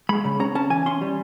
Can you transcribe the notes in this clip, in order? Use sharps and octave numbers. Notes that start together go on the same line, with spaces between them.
G#3 B5
C#3
C#4 A#5
C#4 A5
E3 G#5
C#4 C6
G3